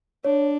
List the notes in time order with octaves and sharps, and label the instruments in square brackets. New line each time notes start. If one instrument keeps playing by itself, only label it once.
[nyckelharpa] D4 [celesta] C#5